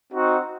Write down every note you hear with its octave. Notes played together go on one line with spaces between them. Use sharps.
C4 D#4 F#4